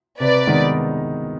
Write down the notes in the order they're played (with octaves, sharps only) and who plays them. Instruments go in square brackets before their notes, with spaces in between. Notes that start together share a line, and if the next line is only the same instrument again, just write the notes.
[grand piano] C3 [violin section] B4 D5
[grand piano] D#3 G#3 B3 D#4